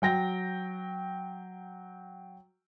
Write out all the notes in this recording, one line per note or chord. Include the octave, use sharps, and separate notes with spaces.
F#3 G5 A#6